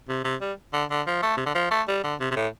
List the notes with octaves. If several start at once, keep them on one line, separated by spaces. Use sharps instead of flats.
C3
C3
G3
D3
D3
F3
A3
C3
D3
F3
A3
G3
D3
C3
C3
A2